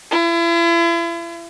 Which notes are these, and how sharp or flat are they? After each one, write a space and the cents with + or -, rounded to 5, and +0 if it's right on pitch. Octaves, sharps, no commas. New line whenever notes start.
E4 +40